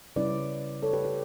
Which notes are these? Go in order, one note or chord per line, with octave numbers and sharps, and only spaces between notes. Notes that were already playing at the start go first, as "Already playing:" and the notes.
C#3 G3 C#4 E4 B4 D5
A4 C#5
G4 B4
G4